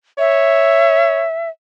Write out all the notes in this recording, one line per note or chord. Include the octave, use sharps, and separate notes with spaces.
C#5 E5